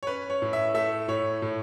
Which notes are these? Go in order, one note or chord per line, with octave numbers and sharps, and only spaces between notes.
C#5
C#4 B4
C#5
A2
E5
A3 E5
A2 C#5
A2